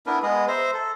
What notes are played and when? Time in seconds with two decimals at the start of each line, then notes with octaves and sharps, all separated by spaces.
0.06 B3 D4 E4 A#4
0.23 G#3 B3 G#4
0.48 C5 E5 A#5
0.74 A4